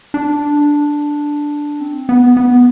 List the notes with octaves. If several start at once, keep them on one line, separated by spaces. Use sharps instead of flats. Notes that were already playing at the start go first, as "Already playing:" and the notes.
D4
C4
B3
B3